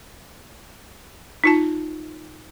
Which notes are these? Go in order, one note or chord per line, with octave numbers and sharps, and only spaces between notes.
D#4 F4 A5